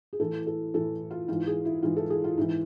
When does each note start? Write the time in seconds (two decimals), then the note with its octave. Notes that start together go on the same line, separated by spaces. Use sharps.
0.13 G#4
0.20 A2 E3 A4
0.47 A4
0.74 A2 E3 A4
1.11 F4
1.28 G#2 E3 F4
1.47 G#4
1.65 E4
1.82 G#2 E3 F4
1.97 A4
2.10 G#4
2.24 F4
2.37 G#2 E3 E4